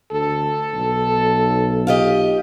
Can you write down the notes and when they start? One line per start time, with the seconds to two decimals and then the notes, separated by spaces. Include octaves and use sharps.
0.12 D2 A4
0.73 B1
1.87 F4 G4 D#5